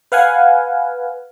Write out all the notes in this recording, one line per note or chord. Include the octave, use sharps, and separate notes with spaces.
B4 F5 F#5 G#5